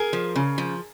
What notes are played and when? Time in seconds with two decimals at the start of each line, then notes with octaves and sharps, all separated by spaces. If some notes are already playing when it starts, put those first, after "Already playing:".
Already playing: G#4 A#4
0.13 F3
0.36 C#3
0.58 F3